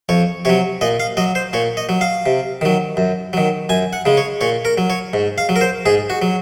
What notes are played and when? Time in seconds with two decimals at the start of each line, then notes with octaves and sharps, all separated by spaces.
0.09 F2 C#5
0.45 C3 F#3 C#5
0.81 A#2 D#5
1.00 F5
1.17 F#3 D#5
1.35 C5
1.53 A#2 C#5
1.77 D#5
1.89 F#3
2.01 F5
2.26 C3
2.61 D#3 F#3
2.97 F#2
3.33 D#3 F#3
3.69 F#2 G#5
3.93 F#5
4.05 C#3 G#3
4.17 C#5
4.41 A#2 C#5
4.65 A#4
4.78 F#3
4.90 C#5
5.13 G#2
5.38 F5
5.49 F#3
5.56 A#4
5.61 C5
5.86 G#2 G#4
6.10 F#4
6.22 F#3